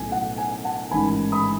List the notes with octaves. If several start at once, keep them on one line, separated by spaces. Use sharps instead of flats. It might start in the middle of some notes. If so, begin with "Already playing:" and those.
Already playing: B1 A2 F#3 B3 G#5
F#5
G#5
F#5 A5
A1 G#2 D#3 G#5 B5
B5 D#6